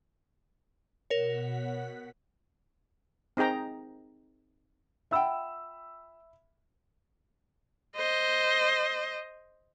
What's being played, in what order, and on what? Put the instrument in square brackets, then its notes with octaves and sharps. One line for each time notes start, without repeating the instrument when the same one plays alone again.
[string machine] B2 F#5 B6 [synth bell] A#4 C#5
[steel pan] C4 D#4 G#4 G5 A#5
[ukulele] F4 F#5 G5 [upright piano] E5 B5 E6
[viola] C5 D#5